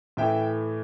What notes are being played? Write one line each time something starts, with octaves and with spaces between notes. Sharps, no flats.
A2 E3 A3 E5 G5